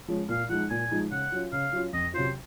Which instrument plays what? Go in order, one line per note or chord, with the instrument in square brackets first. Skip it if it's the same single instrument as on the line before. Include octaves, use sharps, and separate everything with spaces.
[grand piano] F3 G#3 C#4
[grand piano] A#2 [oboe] F5
[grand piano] F3 G#3 D#4 [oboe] F#5
[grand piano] A#2 [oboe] G#5
[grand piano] F3 G#3 D#4
[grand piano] C#3 [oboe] F#5
[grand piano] F#3 C#4 F4
[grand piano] C#3 [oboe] F5
[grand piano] F#3 C#4 F4
[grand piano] F2 [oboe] D#5
[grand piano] C3 F#3 C#4 F4 [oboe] C5